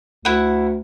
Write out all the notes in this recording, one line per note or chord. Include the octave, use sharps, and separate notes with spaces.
D2 E4 F#5